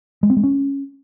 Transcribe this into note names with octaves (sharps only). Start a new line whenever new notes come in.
G#3
C4
G#3
C#4